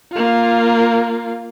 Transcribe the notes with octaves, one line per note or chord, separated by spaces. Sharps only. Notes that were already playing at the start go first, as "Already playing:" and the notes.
A#3 F4